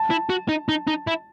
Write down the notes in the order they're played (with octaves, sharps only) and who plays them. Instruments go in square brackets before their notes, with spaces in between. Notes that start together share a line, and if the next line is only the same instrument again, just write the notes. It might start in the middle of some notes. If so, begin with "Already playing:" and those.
Already playing: [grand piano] A5
[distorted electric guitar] E4
F#4
D#4
D#4
D#4
E4